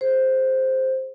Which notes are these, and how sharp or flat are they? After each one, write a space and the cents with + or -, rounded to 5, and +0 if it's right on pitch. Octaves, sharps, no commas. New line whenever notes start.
G#4 +0 C5 +0